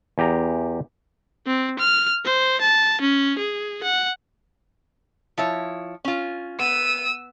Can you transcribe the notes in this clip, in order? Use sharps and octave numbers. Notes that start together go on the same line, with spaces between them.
E2 G4 A#5
C4
F6
C5
A5
C#4
G#4
F#5
F3 E4 C#5
C#4 F4
B3 E6 D#7